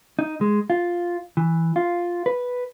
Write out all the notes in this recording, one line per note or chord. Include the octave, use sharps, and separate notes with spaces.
D#4
G#3
F4
E3
F4
B4